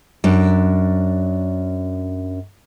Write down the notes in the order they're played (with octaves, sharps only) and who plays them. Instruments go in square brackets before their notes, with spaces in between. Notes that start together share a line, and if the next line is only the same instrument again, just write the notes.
[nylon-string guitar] F#2 D4